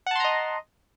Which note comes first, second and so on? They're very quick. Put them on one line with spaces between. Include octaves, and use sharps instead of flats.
F#5 A5 C6 A#5 D#5